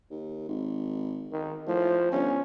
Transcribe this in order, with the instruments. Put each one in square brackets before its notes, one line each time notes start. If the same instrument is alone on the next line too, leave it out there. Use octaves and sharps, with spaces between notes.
[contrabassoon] D#2
G#1
[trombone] D#3
[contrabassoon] A2 [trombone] F3
[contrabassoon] G1 [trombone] C#4